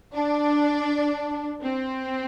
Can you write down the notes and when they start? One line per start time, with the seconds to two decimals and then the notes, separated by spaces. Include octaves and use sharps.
0.14 D4
1.63 C4